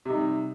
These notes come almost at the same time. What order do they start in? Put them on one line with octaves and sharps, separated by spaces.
C3 D#4 G3